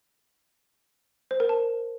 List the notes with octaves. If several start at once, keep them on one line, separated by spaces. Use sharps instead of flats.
C5
A#4
A5